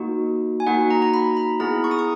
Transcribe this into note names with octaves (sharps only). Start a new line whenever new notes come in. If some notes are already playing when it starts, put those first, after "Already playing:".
Already playing: A#3 D#4 F#4
G#5
A#3 D#4 F#4 F#5
A#5
A#5
B5
B5
B3 E4 G#4 A#5
C#6
D#6
C#6